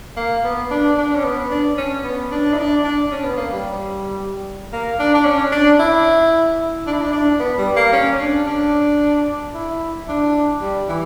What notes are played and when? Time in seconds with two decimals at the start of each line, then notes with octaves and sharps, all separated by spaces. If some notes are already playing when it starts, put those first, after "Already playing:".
0.16 A#3
0.44 B3
0.71 D4
0.97 D4
1.15 C#4
1.24 B3
1.50 D4
1.77 C#4
2.04 B3
2.32 D4
2.53 E4
2.58 D4
2.84 D4
3.12 C#4
3.24 B3
3.37 A#3
3.52 G3
4.73 A#3
4.99 D4
5.14 D4
5.25 C#4
5.52 D4
5.79 E4
6.87 D4
6.93 E4
7.01 D4
7.13 D4
7.40 B3
7.58 G3
7.76 A#3
7.93 C#4
8.20 D4
8.46 D4
9.54 E4
10.08 D4
10.61 G3
10.88 E3